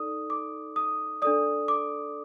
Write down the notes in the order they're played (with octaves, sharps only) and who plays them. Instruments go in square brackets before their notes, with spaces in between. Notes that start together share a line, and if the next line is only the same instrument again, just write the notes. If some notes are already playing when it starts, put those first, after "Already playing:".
Already playing: [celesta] D#4 A4 D5 D#6
D6
D#6
D4 A4 D5 D#6
D6